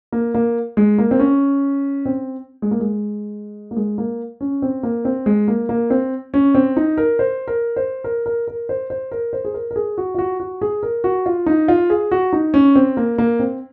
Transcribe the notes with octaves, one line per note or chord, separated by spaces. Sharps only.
A#3
A#3
G#3
A#3
C4
C#4
C4
G#3
A#3
G#3
A#3
G#3
A#3
C#4
C4
A#3
C4
G#3
A#3
A#3
C4
C#4
C4
D#4
A#4
C5
A#4
C5
A#4
A#4
A#4
C5
C5
A#4
C5
G#4
A#4
A#4
G#4
F#4
F4
F#4
F#4
G#4
A#4
F#4
F4
D#4
F4
G#4
F#4
D#4
C#4
C4
A#3
A#3
C4